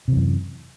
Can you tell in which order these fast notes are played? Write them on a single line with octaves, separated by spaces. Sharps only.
C3 E3 F#2